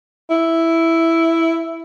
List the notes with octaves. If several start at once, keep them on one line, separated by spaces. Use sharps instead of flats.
E4